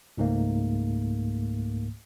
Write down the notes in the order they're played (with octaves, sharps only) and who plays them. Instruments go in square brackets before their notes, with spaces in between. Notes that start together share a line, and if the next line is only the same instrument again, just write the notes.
[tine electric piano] C#2 G#2 A3 A#3